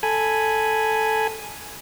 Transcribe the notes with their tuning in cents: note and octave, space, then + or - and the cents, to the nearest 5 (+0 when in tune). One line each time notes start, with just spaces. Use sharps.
A4 +0 G#5 +0 B5 +0